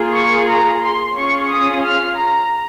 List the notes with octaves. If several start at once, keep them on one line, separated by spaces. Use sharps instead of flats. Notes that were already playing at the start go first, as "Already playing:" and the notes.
Already playing: A#3 F4 G#4
C#6
A#5
C6
C#4 F4 G#4 C#6
D#6
F6
A#5